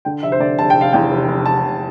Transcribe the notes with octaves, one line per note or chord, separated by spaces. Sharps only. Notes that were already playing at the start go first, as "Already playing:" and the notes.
D3 G5
F1 E5
C5
D3 D5
F1 A5
G5
F1
F5
E2 G5
F1
F1
F1 A5
F1